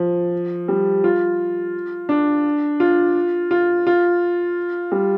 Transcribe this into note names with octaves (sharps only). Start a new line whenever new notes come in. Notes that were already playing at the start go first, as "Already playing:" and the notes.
Already playing: F3
G3
F4
D4
F4
F4
F4
G3